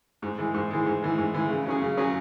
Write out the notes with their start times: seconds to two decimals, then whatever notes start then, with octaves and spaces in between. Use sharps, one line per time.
0.22 G#2
0.38 E3 G#3
0.54 G#2
0.71 E3 G#3
0.86 G#2
1.02 E3 G#3
1.18 G#2
1.34 E3 G#3
1.49 C#3
1.66 F#3 C#4 G#4
1.81 C#3
1.97 F#3 C#4 G#4